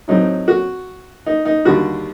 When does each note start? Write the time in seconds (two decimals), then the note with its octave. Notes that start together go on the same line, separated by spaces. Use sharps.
0.08 A2 F#3 C4 D#4
0.48 F#4
1.26 D#4
1.45 D#4
1.65 D#2 D3 G3 F#4